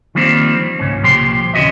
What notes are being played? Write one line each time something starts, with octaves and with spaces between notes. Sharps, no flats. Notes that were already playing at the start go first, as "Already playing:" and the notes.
D#3 F3 G3 A#3 C4
C#2 G#2 C#4
C2 A#2 F3 G4 C6
D#2 C#3 F#4 D#5 E5